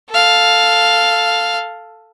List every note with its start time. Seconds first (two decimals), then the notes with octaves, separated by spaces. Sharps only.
0.10 A4 F5